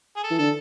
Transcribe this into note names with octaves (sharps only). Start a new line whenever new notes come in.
G#4
A4
E3
D3 A4